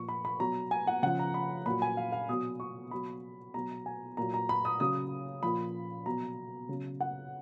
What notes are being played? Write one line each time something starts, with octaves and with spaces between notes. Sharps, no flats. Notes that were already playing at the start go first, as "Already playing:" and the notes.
Already playing: A#2 F3 C#6
B5
B5
B2 F#3 A#5
G#5
F#5
C#3 F3 F#5
A#5
B5
A#2 F#3 B5
G#5
F5
F5
B2 F#3 D#6
C#6
B2 F#3 B5
B2 F#3 A#5
G#5
A#2 F#3 A#5
A#5
B5
D#6
C#3 F#3 D#6
A#2 F3 B5
B2 F#3 A#5
C#3 F#3
F#5